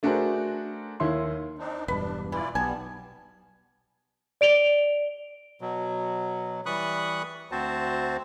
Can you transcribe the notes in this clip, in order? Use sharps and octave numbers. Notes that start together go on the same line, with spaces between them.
A3 D4 F#4 G#4 A#4 C5
D#2 D#3 E4 C#5 C6
C4 D4 D#4
E1 G2 D4 B4
E3 E4 F4 D5
B1 G3 B3 G#5 A5
D5 D7 F7 G7
B2 F#3
E3 G3 B5 C#6 D#6 F#6
D2 C4 F#4 C5 A5